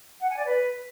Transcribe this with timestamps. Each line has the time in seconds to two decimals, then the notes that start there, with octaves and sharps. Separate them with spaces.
0.20 F#5
0.29 G#5
0.37 D5
0.46 B4